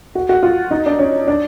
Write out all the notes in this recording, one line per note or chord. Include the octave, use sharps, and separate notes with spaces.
F#4
F#4
F4
D#4
D4
C#4
D4